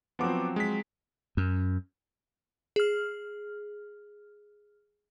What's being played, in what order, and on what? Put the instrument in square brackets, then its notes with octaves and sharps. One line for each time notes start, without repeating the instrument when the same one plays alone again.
[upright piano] F3 F#3 C4 [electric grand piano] B3 F#5 D6
[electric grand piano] G#3 B6
[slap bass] F#2
[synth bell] G#4 F6